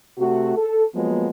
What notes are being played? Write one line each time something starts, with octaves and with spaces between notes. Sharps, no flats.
C3 A3 F#4
A4
F3 F#3 G#3 A#3 B3